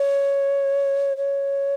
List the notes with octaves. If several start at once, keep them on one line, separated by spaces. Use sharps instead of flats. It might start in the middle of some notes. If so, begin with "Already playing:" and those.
Already playing: C#5
C#5